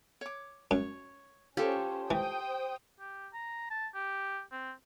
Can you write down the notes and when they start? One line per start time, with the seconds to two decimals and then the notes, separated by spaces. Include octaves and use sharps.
0.21 C#5 D6
0.71 F#2 C#5
1.57 C#4 F4 G4 A4 C5 C#5
2.11 E3 C5 G5 D#6
3.00 G4
3.33 A#5
3.70 A5
3.95 G4
4.52 C4